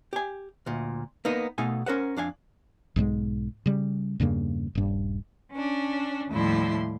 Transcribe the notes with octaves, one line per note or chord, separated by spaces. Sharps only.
G4 G#5
D2 A#2
A#3 B3 D#4
B2 A3 D#4 F5 G#5
C#4 A#4 C5 F#5
F2 D4 F5 G#5
B1 G#2 G3 G#3
C#3 G3
E2 G2 C#3 A#3
D#1 G2
C#4 D4
D#2 A2 F3 G3 E4 C6